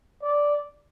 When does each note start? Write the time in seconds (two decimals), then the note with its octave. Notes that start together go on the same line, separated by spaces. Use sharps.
0.22 D5